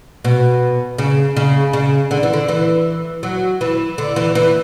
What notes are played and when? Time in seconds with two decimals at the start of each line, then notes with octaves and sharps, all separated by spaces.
0.24 B2
0.98 C#3
1.36 C#3
1.73 C#3
2.11 D3
2.23 E3
2.33 D3
2.48 E3
3.23 F#3
3.61 E3
3.98 D3
4.16 E3
4.35 E3